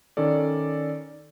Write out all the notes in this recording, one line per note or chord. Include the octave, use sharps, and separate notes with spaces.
D#3 C#4 A4 D5